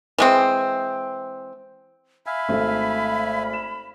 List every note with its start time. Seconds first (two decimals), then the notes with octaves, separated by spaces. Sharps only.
0.18 E3 G#3 C4
2.26 E5 F5 G#5 B5
2.49 G#1 A3
3.53 E7